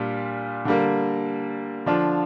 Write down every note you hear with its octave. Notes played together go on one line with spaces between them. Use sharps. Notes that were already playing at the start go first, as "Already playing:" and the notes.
Already playing: A#2 G3 D4 F4
D3 G3 A#3
D3 F3 D4 F4